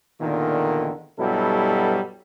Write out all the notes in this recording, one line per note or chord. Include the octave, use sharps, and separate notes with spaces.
E2 A#2 D3 D#3
G2 B2 F#3 G3 E4 A4